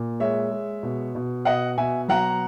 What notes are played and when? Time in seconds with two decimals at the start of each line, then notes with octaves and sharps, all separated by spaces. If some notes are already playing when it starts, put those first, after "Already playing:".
Already playing: A#2
0.20 G#3 C#5 E5
0.51 G#3
0.83 B2
1.15 B2
1.45 B2 D#5 F#5
1.78 B2 E5 G#5
2.08 F#3 F#5 A#5